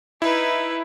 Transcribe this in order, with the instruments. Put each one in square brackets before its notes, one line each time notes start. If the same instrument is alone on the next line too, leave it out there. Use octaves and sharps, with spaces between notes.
[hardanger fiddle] D#4 B4 [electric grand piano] E4